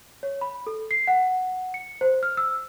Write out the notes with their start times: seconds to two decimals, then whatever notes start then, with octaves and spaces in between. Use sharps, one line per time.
0.23 C#5
0.41 B5
0.67 A4
0.91 C7
1.07 F#5
1.74 C#7
2.01 C5
2.23 F6
2.37 E6